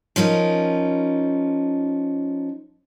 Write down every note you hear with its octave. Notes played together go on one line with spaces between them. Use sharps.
F3 C#4 D#4 A#4